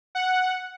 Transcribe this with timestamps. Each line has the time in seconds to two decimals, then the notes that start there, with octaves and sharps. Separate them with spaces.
0.15 F#5